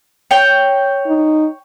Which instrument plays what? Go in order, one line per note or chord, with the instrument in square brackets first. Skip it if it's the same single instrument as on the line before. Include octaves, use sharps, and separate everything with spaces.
[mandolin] C#5 G5
[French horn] D#4